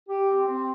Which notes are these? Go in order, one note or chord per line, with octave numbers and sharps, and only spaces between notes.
G4
C4
C4